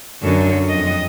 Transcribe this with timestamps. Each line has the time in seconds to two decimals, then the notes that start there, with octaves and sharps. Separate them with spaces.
0.22 F#2 D3 A4
0.68 F2 D#5